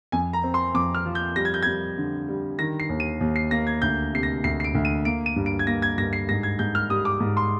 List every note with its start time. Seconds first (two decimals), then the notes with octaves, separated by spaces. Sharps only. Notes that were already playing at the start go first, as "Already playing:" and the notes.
0.12 F2 G#5
0.33 A#5
0.44 C4
0.54 C6
0.74 F2 D6
0.95 F6
1.06 F3
1.15 G6
1.36 G3 A#6
1.45 G#6
1.54 G6
1.62 G3 G#6
1.98 D3
2.28 G3
2.59 D#3 A#6
2.80 C7
2.89 D#2
3.00 D#7
3.21 D#2
3.36 C7
3.51 A#3 A#6
3.67 G#6
3.82 D2 G6
4.13 C3 C7
4.23 A#6
4.44 D2 C7
4.60 C7
4.64 D7
4.75 D2
4.85 D#7
5.05 A#3 D7
5.26 D#7
5.36 G2
5.46 D7
5.59 G#6
5.67 A#3 A#6
5.82 G#6
5.98 G2 A#6
6.13 C7
6.29 G#2 A#6
6.43 G#6
6.59 G#2 G6
6.75 F6
6.90 G3 D#6
7.05 D6
7.20 G#2
7.37 C6